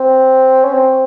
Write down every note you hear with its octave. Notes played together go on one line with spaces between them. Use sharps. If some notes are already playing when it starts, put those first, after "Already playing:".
Already playing: C4
C#4
C4